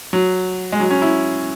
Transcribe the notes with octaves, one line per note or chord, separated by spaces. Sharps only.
F#3
G#3
F#3
C#4
E4